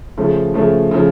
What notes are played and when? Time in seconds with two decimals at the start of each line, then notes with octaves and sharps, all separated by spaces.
0.17 C#3 F3 A3
0.54 C#3 F3 A3
0.91 C#3 F3